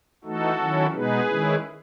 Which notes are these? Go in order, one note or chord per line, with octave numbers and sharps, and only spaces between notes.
E3 A3 D#4 F#4 A4
D#3 F#3 C#4 E4
B2 G#3 B3 D#4 G#4 B4
D#3 G#3 C#4 E4